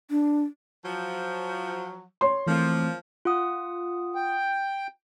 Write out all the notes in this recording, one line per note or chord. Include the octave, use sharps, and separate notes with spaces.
D4
F3 F#3
C#5 C6
E3 F3 A3 A#3 C4
F4 F#5 D#6
G5